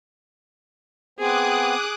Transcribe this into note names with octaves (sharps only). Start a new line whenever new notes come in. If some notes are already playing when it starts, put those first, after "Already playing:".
B3 C4 G#4 C5 D6 D#6 F#6